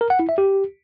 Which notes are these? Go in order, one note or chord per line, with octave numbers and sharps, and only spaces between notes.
A#4
F#5
E4
E5
G4